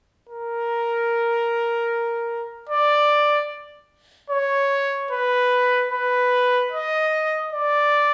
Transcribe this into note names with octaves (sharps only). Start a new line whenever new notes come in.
A#4
D5
C#5
B4
B4
D#5
D5